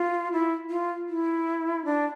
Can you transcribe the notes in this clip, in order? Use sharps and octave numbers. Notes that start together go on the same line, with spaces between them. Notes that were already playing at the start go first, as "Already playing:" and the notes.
Already playing: F4
E4
F4
E4
D4